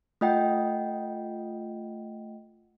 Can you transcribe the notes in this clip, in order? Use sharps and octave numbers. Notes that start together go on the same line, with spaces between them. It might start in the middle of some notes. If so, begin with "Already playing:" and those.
A3 F4 D#5 F#5 G5